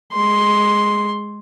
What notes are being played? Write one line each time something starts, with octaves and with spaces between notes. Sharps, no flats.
G#3 C6